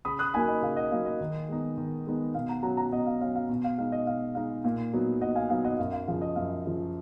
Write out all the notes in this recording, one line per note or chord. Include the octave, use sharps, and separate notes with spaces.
C#3 B5 D#6
D#6 F#6
F#3 A#3 D#4 G#5 B5
D#5
C#3 F5
D#5 F#5
F#3 A#3 D#4 F5
D#5
D#3
G#3 B3 D#4
D#3
G#3 B3 D#4
B2 F5
F#5 A#5
F#3 C#4 F#5 A#5
F#5 A#5
B2 D#5 F#5
F5
F#3 C#4 F5
F5
B2
F5
G#3 D#4 F5
D#5
B2 F5
G#3 D#4 F5
A#2 F5
F#3 B3 D#4
A#2 D#5 F#5
F5 G#5
F#3 B3 D#4 F5
D#5 F#5
F#2 F5
F5
C#3 F3 F5
D#5
F#2 F5
C#3 F3